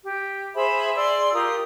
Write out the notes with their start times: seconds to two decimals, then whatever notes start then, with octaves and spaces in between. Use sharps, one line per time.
0.05 G4
0.55 G#4 C5 E5 B5
0.95 G#4 D5 C6 E6
1.33 F4 G4 A#4 D#6